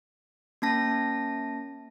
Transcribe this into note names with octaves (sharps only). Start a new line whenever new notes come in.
A#3 C#4 A5 A#6